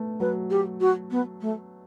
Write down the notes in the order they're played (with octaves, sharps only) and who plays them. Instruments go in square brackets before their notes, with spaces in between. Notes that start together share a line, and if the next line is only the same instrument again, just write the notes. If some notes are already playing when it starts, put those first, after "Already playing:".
Already playing: [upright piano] A3 B3
[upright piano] F#3 [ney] B4
[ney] G4
F#4
B3
A3